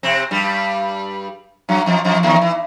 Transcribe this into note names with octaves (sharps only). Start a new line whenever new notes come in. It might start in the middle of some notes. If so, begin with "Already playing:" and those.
C3 C4
G2 G3
F#2 F#3
F2 F3
F2 F3
D#2 D#3
E3